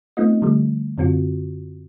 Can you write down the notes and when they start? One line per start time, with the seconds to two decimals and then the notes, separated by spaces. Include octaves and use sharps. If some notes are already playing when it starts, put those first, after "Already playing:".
0.17 A3 B3 C4 D#4 F4 D#5
0.42 D3 F3 G3 A3
0.98 F#2 D3 C4 F4 F#4